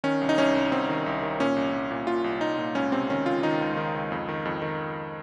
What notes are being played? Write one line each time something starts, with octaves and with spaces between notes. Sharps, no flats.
D#3 C#4
C2
D#4
C2 C#4
C2
C2 C4
D#3
C2
D#3
A#2 C#4
C2
C2
A#2
A#2 F4
C2
C2 D#4
A#2
C#2 C#4
C3 C4
D#3 C#4
C#2 F4
D#3 D#4
C#2
D#3
C#2
F2
D#3
F2
D#3